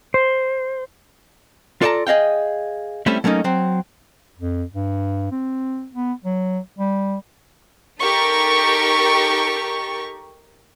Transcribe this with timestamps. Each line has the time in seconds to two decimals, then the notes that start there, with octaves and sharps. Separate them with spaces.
0.14 C5
1.82 F4 A4 D5 G5 A5 A#5
2.07 G#4 D#5 F5 G5
3.06 G3 A3 C4 C#4 E4 A4
3.24 F#3 A3 A#3 C#4 D#4
3.44 F#3 C4
4.39 F2
4.74 G2
5.32 C4
5.94 B3
6.24 F#3
6.79 G3
8.02 D#4 G4 A4 A#4 C#6